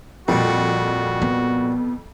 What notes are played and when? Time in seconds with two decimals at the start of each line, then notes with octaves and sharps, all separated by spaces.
0.28 F2 A#2 G3 F#4
1.22 B3